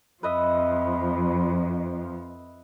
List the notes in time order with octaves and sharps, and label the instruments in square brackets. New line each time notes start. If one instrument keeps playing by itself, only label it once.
[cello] F2 F3 [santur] B4 D#5 E5